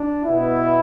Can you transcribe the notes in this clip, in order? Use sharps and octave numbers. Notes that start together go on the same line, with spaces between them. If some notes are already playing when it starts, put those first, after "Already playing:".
Already playing: D4
B2 B3 E4